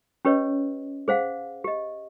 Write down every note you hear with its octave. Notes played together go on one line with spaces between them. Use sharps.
C#4 G4 B4 C#5 D#5
G#4 C5 F5 F#5
G4 D#5